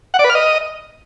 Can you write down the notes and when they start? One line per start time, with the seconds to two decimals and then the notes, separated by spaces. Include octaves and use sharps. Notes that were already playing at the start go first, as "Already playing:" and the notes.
0.14 F#5
0.19 D5
0.24 B4
0.30 F6
0.35 D#5